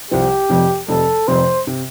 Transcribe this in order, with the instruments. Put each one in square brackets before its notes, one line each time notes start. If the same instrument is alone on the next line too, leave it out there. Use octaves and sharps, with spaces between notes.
[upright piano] C2 C3 F3 C4 [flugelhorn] G4
[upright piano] F1 F2 C3
[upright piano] F1 F2 C3 [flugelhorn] A4
[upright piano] F1 F2 C3 [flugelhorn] C5
[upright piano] C3